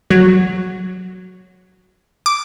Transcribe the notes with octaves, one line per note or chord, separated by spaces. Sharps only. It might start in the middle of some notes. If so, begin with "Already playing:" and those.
F#3 F#4
D6